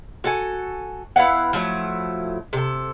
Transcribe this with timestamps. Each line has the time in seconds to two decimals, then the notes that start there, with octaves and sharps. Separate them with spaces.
0.24 F#4 A4 G#5
1.16 B3 E4 F5 F#5
1.53 F3 F#3 A3 E4
2.53 C3 A4